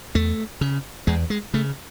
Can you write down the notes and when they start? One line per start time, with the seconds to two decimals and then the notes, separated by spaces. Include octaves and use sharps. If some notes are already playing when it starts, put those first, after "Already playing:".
0.15 E2 A3
0.61 C#3
1.07 E2 G#3
1.30 G#3
1.54 C#3 A3